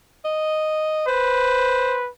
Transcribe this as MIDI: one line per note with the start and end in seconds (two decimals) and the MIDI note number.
0.25 1.03 75
1.07 2.09 71
1.07 1.97 72